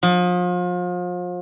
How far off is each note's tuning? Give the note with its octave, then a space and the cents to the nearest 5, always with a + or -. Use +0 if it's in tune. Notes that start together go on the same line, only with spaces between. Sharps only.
F3 +35